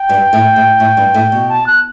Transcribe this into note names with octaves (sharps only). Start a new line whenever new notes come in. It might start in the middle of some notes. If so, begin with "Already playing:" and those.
Already playing: G5
G2
A2
A2
A2
G2
A2
B2
A5
F#6